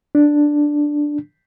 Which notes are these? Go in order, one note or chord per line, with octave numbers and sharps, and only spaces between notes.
D4